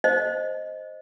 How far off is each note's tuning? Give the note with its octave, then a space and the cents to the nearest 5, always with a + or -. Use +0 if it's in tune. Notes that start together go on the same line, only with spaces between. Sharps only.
C5 +5 D#5 +0